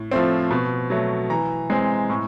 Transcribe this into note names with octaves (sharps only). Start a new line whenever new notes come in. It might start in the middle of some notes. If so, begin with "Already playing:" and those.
Already playing: A2
F3 A3 C4
B2
F#3 A3
E3 A#5
G#3 C4
A2